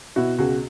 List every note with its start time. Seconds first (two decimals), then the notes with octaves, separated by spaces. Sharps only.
0.16 B2 E4 F#4
0.38 C#2 F#4 G#4